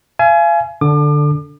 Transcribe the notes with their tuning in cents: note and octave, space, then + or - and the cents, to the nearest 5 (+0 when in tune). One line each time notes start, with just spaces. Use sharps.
F5 -40 G#5 +25
D3 +0 D4 -15 D6 +35